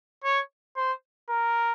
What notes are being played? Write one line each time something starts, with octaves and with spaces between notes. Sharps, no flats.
C#5
C5
A#4